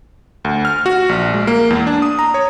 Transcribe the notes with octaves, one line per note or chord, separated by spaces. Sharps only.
D2
F6
F#4
A#1
G#3
A#3
E2
D4
D#6
A#5
C#5